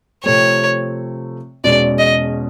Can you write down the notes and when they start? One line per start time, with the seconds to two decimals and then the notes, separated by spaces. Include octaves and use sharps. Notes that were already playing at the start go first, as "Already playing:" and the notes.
0.24 C3 F3 A3 C4 C#5
1.64 E2 B2 G#3 C#4 D5
1.99 D#5